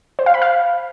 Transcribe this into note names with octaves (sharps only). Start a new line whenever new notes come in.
C5
F5
B5
F5